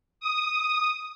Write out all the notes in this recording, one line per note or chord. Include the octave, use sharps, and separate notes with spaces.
D#6